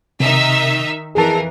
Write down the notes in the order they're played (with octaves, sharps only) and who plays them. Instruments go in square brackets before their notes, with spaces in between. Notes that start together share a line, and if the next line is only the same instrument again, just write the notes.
[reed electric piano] C3 [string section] D#3 D#4 E5
[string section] F2 E3 A#4 [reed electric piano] G#4 A5